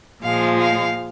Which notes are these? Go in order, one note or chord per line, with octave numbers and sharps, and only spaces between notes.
A#2 F3 G#3 F5
F5